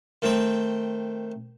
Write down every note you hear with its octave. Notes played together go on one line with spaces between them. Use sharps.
D#3 A3 C4 G5